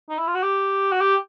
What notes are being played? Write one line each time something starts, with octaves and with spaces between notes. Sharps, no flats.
D#4
E4
F4
F#4
G4
F#4
G4